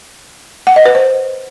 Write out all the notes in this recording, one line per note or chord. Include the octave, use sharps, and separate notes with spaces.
F#5
D#5
B4
C5